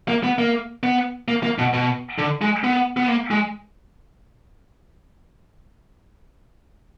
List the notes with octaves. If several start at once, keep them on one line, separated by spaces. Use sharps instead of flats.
A#3
B3
A#3
B3
A#3
A#3
B2
B2
D3
G#3
B3
B3
A#3
G#3